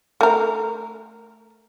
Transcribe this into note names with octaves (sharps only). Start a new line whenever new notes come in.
A3 A#4